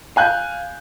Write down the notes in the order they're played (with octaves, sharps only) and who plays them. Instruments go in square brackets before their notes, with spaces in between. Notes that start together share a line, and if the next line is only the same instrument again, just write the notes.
[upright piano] F5 G#5 F#6 G6